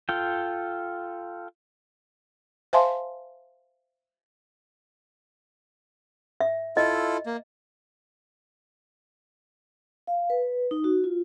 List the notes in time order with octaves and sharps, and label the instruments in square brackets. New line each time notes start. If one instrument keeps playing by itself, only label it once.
[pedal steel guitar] F4 A4 G5
[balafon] C5 E5 F5 G#5 A5 C6
[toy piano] E5
[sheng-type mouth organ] E4 F4 A4 [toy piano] D#5
[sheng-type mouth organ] A#3
[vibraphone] F5
B4
D#4
F#4
F4